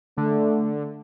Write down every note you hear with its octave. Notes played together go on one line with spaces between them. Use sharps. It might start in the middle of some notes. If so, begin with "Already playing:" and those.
D3 A3